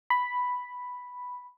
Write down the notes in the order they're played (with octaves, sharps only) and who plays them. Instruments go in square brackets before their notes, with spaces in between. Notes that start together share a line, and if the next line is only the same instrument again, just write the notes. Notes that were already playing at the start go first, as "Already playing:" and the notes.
[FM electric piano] B5